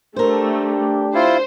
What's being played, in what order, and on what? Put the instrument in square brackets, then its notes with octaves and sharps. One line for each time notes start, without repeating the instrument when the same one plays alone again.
[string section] A3 [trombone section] D4 G4 [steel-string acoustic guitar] A#4 C5
[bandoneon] E4 F4 [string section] C5